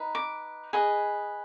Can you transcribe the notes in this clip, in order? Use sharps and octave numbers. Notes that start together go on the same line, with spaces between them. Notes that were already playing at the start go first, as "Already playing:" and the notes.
Already playing: D#4 B4
D6
G#4 B4 D#5